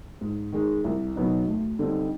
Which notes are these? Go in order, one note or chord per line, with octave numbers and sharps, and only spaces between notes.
G#2
D#3 G#3
C2
B2 F#3 B3 D#4
D2
D3 G3 C4 D#4